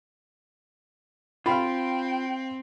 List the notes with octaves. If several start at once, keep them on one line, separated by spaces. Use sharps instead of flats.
C4 F4 F5 G5 B5